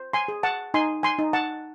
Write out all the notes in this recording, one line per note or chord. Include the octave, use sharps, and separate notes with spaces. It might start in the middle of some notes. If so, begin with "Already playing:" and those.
Already playing: C5
G#5 C6
G#4
F#5 A5
D#4 G#5 C6
G#5 C6
D#4
F#5 A5